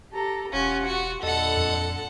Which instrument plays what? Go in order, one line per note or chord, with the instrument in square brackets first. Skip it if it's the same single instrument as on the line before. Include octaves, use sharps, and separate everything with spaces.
[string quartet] G4 A4 A#5
[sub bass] E1 [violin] C#4 [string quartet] F4 G4 F#5
[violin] F#4
[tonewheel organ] E2 D#5 [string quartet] A#2 D3 [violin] A4 F#5
[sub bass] F2